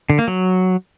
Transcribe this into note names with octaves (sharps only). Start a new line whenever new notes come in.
D3
A#3
F#3